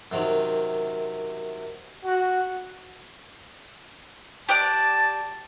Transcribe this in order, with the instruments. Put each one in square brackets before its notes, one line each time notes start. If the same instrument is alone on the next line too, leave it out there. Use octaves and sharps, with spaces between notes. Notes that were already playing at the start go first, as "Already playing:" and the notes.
[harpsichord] F#2 C3 D#3
[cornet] F#4
[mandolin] G4 D5 F#6 [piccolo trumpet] A5